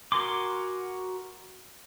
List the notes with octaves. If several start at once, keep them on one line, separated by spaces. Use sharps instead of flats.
F#4 A#4 G#5 C6 D6